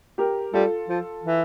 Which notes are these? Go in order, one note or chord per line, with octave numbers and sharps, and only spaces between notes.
G4 A#4
G3 F4 A4
F3
E3